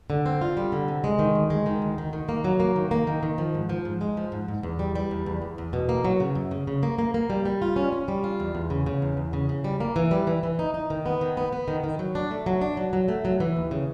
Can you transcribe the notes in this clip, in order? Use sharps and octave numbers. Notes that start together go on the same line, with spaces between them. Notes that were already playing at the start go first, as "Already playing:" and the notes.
D3
C4
F4
G3
D3
C3
G#3
D#3
D2
G#3
D#3
D2
D#3
D#3
A#3
F#3
A#3
D#3
A#3
D#3
D#3
F3
G#2
F3
G#2
G#3
F3
G#2
G#2
E2
G3
G3
E2
E2
E2
E2
B2
A#3
F#3
C#3
F#2
C#3
C#3
A#3
A#3
A#3
G3
G3
F4
C#4
C#4
G3
F4
E2
E2
C#3
C#3
E2
E2
C#3
C#3
G3
A#3
E3
G3
E3
E3
D#4
D#4
D#3
B3
D#3
B3
B3
D#3
D#3
F#3
D4
A3
F#3
D4
F#3
F#3
A3
F#3
E3
D#2
C#3